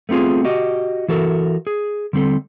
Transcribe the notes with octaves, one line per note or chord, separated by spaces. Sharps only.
A3 B3 C4 F4 G#4
F#4 G4 D#5
E3 F#4 A4 A#4
G#4
D3 G3 C4 A4